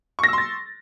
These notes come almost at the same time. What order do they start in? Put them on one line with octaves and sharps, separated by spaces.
C#6 A#6 E6 C6 A6